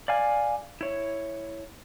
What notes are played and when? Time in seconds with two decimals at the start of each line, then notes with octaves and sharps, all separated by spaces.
0.08 D5 F5 G#5
0.81 E4 C#5